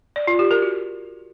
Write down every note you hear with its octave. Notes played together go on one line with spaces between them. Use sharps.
D5
F4
G4
A#4
F#4